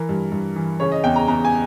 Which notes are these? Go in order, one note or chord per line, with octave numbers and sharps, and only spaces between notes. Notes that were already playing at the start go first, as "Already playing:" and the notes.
Already playing: E3 A#4
G2
G2
E3
C#3 C#5
D#5
E2 G5
A#5
E2 A#5
G#5